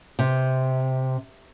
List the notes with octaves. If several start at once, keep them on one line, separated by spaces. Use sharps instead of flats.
C3